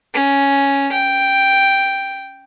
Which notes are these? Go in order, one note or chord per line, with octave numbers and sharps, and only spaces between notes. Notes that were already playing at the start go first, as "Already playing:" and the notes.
C#4
G5